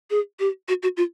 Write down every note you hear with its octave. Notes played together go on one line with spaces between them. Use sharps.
G#4
G4
F#4
F#4
F4